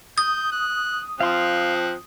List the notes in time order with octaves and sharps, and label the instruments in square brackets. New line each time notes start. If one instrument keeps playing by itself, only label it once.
[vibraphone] D#6 [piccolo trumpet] G6
[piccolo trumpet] F#6
[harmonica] F3 C4 [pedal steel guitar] F5 C6 [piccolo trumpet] F#6